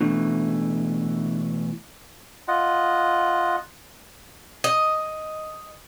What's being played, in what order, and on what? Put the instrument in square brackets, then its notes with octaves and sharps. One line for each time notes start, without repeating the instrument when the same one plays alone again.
[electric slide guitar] B2 E3 A3 [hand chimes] D4
[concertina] F4 D#5 F#5
[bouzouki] D#5